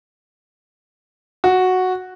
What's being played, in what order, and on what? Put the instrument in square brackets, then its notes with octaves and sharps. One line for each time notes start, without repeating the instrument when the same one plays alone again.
[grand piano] F#4